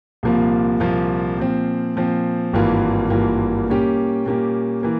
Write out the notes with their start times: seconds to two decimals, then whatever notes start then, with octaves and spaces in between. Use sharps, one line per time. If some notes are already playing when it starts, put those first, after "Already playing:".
0.23 C2 A#2 F3 A#3 F4
0.80 C2 A#2 F3 A#3 F4
1.37 A#2 F3 C4
1.96 A#2 F3 C4
2.53 G#1 G2 E3 A#3 F4
3.10 G#1 G2 E3 A#3 F4
3.68 A#2 G3 A#3 C#4 G4
4.26 A#2 G3 A#3 C#4 G4
4.83 E3 A#3